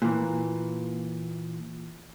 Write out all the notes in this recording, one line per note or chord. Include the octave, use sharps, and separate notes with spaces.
A#2 E3